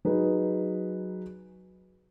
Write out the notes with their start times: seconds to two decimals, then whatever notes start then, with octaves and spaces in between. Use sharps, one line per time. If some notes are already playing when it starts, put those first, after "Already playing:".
0.05 F#3 D#4 G#4 B4